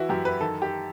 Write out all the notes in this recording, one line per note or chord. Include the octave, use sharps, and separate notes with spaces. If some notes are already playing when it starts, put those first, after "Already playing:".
Already playing: E3 E4 F#4
F#2 G4
B4
D#3 A4
G4